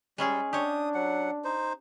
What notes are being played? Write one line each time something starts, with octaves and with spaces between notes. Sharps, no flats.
G3 G#3 C#4 G#4
D4 G4 C#5 D#6
F#3 F#5
D#4 C5